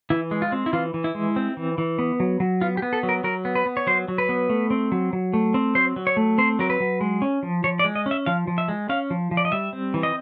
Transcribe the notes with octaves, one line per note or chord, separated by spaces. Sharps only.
E3 E4
G#3
F4
C4
E4
E3 F4
E3
E4
G#3
C4
E3
E3
B3
F#3
F#3
B3 F4
G4
B3
A4
F#3
A#4
F#3 A#4
B3
B4
B3
C#5
F#3 C5
F#3
B4
B3
A3
C4
F#3
F#3
A3
C4
F#3 C5
F#3
C#5
A3
C4 C5
F#3 A#4
B4
F#3
G#3
C#4
F3
F3 C#5
D5
G#3
D#5
C#4
E5
F3 F5
F3
E5
G#3
C#4 F5
F3
F3
D5
D#5
G3 E5
C4
E3
D#5